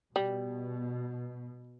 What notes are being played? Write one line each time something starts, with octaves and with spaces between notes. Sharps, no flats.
B2 G3